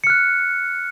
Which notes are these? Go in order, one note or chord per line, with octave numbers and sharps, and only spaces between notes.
F6 F#6 C#7